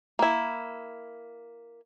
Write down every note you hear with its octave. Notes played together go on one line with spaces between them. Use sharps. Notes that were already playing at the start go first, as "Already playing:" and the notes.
A#3 E4